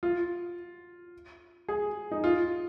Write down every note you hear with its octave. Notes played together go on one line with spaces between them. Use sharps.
F4
G#4
D#4
F4